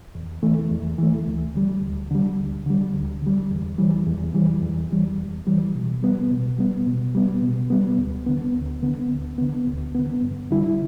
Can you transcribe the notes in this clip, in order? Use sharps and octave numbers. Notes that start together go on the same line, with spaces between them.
E2
E3 A3
E2
E3 A3
D2
D3 G3
D2
D3 G3
D2
D3 G3
D2
D3 G3
E2
E3 G3
E2
E3 G3
E2
E3 G3
E2
E3 G3
B2
G3 B3
B2
G3 B3
B2
G3 B3
B2
G3 B3
D2
D3 B3
D2
D3 B3
D2
D3 B3
D2
D3 B3
G2
D3 G3 E4